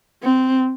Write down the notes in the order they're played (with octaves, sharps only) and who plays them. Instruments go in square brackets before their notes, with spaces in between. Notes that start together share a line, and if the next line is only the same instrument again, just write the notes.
[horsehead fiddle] C4